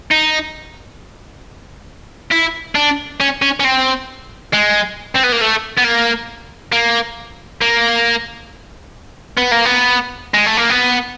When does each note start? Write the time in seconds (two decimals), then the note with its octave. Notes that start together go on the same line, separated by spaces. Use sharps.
0.11 D#4
2.32 E4
2.75 D4
3.21 C#4
3.42 C#4
3.60 C#4
3.65 C4
4.53 G#3
5.15 C4
5.23 B3
5.32 A#3
5.41 A3
5.78 B3
5.85 A#3
6.72 A#3
7.61 A#3
9.37 B3
9.51 A#3
9.65 B3
10.34 G#3
10.46 A3
10.57 A#3
10.70 B3